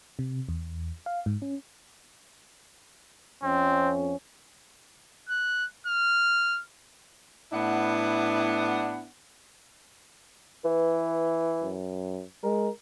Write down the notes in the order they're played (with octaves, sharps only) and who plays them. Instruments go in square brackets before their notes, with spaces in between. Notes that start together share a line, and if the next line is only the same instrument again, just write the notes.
[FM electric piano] C3
E2
F5
G#2
C#4
[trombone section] F2 C#4 [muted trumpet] C4
[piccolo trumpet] F#6
F6
[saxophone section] A2 B3 D4 E4 F#5
[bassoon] E3 [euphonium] B4
[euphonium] F#2
[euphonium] G#3 [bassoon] A#4